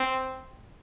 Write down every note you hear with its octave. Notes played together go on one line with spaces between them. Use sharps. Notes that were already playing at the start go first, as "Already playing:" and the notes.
Already playing: C4